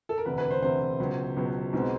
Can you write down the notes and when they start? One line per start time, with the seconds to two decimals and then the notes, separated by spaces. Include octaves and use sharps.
0.09 A4
0.18 A#4
0.25 E1 D2 C3 B4
0.38 B4
0.51 C5
0.62 E1 D2 C3 C5
0.99 C#2 B2 F#3 B3
1.36 C#2 B2 F#3 B3
1.73 B1 B2 G#3 C4